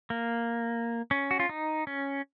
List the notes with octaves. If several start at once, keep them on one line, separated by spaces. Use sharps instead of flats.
A#3
C#4
F#4
F4
D#4
C#4